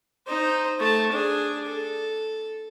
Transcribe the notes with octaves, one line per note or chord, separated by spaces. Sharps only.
D#4 C5
A3 A5
D4 G#4
A4